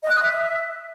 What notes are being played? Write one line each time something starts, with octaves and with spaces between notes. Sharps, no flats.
D#5
F#6
D#6
E5